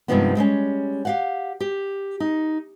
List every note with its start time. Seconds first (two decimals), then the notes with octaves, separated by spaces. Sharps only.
0.08 G2 C3 D#3 F3 G#3 B3
0.35 G3 G#3 C4 C#4
1.05 G4 F5 F#5
1.60 G4
2.20 D#4